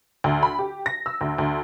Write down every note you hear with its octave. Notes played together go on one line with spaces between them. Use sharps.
D2
B5
G4
A#6
E6
D2
D2